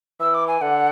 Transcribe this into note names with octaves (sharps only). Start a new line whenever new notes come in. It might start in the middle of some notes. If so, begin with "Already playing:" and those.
E3 E6
D6
G#5
D3 F#5